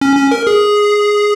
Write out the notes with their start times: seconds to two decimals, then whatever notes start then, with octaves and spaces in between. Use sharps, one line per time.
0.01 C#4
0.17 C#4
0.31 A#4
0.47 G#4